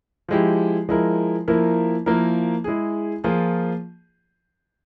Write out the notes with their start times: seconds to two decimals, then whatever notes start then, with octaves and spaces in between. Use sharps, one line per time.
0.28 F3 G#3 E4 G4
0.89 F3 G#3 E4 A#4
1.48 F3 A#3 E4 A#4
2.06 F3 A#3 E4 A#4
2.64 G#3 E4 G#4
3.24 F3 A#3 F4 G#4